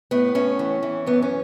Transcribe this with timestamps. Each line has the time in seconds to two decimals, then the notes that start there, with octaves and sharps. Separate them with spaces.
0.11 A2 B3
0.35 A2 C#4
0.59 E3
0.83 E3
1.06 F#2 B3
1.22 C#4